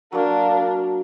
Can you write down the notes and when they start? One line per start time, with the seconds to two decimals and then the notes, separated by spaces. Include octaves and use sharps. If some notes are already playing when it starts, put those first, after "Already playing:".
0.12 F#3 A#3 D4 A#4